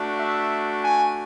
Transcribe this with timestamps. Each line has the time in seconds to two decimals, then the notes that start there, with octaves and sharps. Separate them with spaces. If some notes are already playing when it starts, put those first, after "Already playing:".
Already playing: A3 D4 F#4
0.19 E5
0.84 G#5